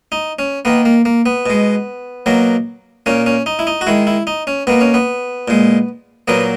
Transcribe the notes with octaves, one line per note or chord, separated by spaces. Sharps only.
D#4
C#4
D#3 A#3 B3
A#3
A#3
B3
B2 G#3
B2 F#3 A#3
A#2 A#3 C#4
C#4
D#4
E4
D#4
F#4
D#3 G#3 E4
E4
D#4
C#4
B2 A#3 B3
C#4
B3
A#2 G#3
A#2 F#3 A#3 B3